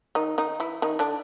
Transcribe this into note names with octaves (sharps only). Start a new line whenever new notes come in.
D#3 D#4
D#3 D#4
E3 E4
D#3 D#4
D3 D4